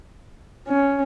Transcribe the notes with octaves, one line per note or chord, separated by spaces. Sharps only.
C#4